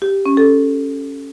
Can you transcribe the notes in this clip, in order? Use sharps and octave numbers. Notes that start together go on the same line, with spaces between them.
G4
C#4
A4